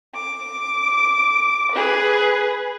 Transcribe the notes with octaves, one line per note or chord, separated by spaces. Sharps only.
D6
G#4 B4